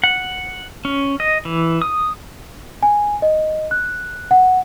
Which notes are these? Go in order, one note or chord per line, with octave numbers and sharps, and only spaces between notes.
F#5
C#4
D#5
E3
D#6
G#5
D#5
F#6
F#5